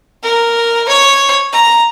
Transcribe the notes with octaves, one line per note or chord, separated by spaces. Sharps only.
A#4
C#5
A#5